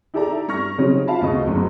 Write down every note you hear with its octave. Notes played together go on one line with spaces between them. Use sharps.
D#4 E4 G4 A4 D5 A#5
G2 C#6 F6 A#6
C#3 F#3 G3 C4 C#4 D#4
F4 F5 A5 B5
D2 C#3 D#5 C#6
F#1 D2